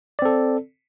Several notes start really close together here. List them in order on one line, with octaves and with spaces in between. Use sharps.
D5 C4 A4